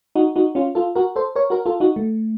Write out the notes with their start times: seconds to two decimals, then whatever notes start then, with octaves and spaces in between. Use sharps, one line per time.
0.15 D#4 F#4
0.36 D#4 F#4
0.55 C#4 F4
0.75 F4 A4
0.96 F#4 A#4
1.16 A4 C5
1.36 A#4 C#5
1.50 F#4 A#4
1.66 F4 A4
1.80 D#4 F#4
1.96 A3